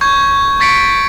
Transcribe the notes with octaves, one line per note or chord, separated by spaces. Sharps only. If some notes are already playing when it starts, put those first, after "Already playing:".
C#6 G6 G#6
C#6 A6 B6 C#7 D7